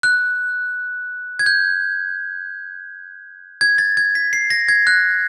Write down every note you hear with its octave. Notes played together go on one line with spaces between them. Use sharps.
F#6
G#6
G6
G#6
A6
G#6
B6
C7
A#6
G#6
F#6